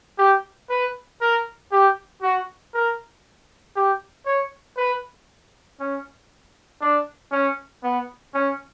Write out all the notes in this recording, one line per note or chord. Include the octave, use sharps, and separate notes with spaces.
G4
B4
A#4
G4
F#4
A#4
G4
C#5
B4
C#4
D4
C#4
B3
C#4